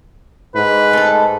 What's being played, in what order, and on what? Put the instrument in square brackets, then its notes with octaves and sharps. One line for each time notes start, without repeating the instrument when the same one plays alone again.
[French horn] G#2 [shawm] B4
[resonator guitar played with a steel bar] A3 A4